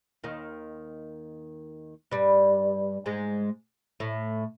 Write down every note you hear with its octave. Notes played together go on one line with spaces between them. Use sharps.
D#2 D#3
G2 G3
G#2 G#3
A2 A3